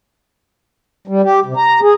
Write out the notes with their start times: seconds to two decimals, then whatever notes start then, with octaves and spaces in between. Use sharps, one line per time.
1.08 G3
1.24 G4
1.46 C3
1.57 A#5
1.82 G#4